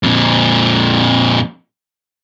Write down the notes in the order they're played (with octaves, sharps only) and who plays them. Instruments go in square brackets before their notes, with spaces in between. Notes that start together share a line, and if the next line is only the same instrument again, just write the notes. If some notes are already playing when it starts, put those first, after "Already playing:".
[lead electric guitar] F2 A#2